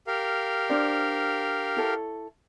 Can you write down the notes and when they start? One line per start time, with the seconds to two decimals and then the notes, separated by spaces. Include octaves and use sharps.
0.07 G4 A#4 F5
0.70 D4 C5 D5
1.77 E4 A4 C#5